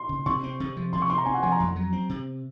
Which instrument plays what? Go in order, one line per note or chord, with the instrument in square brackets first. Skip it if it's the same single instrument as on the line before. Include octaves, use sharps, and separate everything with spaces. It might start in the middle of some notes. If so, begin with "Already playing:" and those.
Already playing: [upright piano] C6
[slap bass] C#3
[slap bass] C3 [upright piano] C#6
[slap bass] C4
C3
F3
[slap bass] C3 [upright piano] C6
[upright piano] C#6
[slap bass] C4 [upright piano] C6
[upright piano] A#5
[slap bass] C3 [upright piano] G#5
[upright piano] F#5
[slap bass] F3 [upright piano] G#5
[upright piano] A#5
[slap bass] F2
F#3
C4
C3